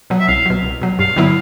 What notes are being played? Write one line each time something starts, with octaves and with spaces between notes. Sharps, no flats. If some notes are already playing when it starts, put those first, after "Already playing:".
B2 F#3
E5
C2 F5
B2 F#3
C2
B2 F#3
G2 F5
D3 F#3 B3 E4